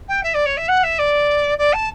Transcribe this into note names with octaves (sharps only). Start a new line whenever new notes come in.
G5
E5
D5
C#5
E5
F#5
E5
D5
D5
A5